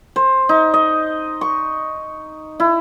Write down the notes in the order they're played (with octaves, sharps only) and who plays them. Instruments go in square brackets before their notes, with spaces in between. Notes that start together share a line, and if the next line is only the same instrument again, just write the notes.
[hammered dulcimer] C5
D#4
D#5
C#6
E4